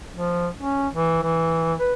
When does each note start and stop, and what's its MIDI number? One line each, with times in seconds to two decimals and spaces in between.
0.17 0.48 53
0.57 0.87 61
0.93 1.21 52
1.23 1.74 52
1.79 1.94 71